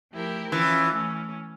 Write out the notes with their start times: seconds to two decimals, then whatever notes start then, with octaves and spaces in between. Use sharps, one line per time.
0.12 F3 A3 E4 G4 A#4
0.52 E3 F3 C#4 F4
0.92 E3 A3 C#4